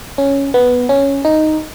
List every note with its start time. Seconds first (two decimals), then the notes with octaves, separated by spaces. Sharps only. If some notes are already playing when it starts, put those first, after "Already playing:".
0.18 C#4
0.54 B3
0.89 C#4
1.25 D#4